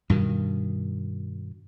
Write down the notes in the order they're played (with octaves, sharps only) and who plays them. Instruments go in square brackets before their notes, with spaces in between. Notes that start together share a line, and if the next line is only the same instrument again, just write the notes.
[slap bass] G2 B2 D#3